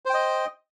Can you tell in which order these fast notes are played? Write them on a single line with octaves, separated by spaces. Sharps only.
C5 G5 D#5